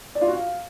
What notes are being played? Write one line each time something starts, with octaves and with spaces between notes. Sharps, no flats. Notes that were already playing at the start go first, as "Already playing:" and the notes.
D5
F4
F#4
F5